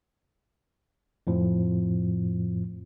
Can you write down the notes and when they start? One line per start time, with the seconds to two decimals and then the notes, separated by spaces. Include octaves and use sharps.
1.27 F2 A2 F3